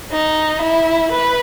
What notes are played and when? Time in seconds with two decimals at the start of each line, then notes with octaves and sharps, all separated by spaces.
0.12 D#4
0.62 E4
1.12 B4